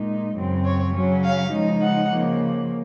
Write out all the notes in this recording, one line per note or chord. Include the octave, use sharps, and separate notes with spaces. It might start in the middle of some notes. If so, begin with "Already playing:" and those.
Already playing: A#2 G#3 D#4
F#2 C#3 F#3 C4
C#5
C#3 F#3 C#4
F5
C#3 F3 G#3 D#4
F#5
C#3 F3 A#3